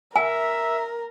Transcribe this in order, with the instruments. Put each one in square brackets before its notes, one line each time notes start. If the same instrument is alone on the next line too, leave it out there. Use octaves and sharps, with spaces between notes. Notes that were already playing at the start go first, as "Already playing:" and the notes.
[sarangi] A#4 [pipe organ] E5 [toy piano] G#5